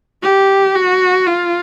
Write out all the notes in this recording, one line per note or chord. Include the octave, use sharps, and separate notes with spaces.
G4
F#4
F4